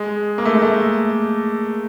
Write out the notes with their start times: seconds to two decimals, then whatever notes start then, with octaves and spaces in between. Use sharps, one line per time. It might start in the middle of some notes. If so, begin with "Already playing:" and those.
Already playing: G#3
0.38 A#3
0.45 A3
0.54 G#3
0.62 A3